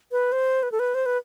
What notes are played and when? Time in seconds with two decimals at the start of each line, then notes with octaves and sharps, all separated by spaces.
0.12 B4
0.32 C5
0.63 B4
0.72 A4
0.79 B4
0.94 C5
1.06 B4